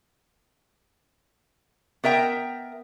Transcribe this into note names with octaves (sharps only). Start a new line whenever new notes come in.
B3 A#4 E5 G5